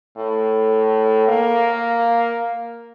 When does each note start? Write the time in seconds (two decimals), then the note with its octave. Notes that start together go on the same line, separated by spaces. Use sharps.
0.17 A2
1.29 A#3